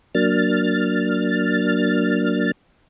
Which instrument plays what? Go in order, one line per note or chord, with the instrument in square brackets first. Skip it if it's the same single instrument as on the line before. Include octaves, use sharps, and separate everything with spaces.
[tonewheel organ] F#3 A#3 D4 F6 A6